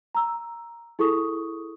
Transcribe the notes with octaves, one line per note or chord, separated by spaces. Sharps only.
A#5 E6
E4 G#4 A4 C#6 D#6